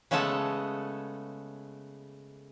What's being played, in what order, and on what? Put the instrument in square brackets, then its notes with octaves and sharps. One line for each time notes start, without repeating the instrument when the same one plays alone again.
[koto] C#3 G#3 A3 B3 A4 F#5